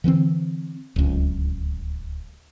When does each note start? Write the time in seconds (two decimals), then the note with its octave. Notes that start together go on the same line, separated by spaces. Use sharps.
0.04 D3 E3 A#3 C4
0.96 D1 C#2